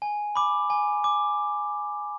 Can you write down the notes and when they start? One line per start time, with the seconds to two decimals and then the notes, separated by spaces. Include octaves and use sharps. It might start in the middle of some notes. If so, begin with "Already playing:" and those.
0.02 G#5
0.35 B5 D6
0.70 G#5
1.04 D6